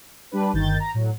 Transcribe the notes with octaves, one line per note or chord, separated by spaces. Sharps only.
G3 D4 B4
G1 D#3 G6 A6
A#5
A2 F#3